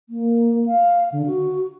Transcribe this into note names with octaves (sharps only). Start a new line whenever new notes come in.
A#3
F5
D3
F#4